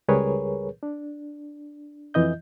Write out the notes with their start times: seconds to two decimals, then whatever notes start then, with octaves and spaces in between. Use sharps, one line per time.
0.08 C#2 G3 G#4 A#4 B4 C#5
0.83 D4
2.14 F2 E3 E4 D#5 G6